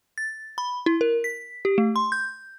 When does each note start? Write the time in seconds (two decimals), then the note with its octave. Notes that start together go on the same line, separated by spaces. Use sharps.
0.18 A6
0.58 B5
0.86 E4
1.01 A#4
1.24 B6
1.65 G4
1.78 A3
1.96 C6
2.12 G6